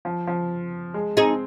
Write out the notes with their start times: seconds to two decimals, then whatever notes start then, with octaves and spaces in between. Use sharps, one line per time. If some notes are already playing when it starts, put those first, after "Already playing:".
0.05 F3
0.27 F3
0.94 G#3
1.17 C4 D#4 G#4